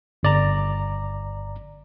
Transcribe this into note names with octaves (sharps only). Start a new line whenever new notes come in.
G1 D5 A#5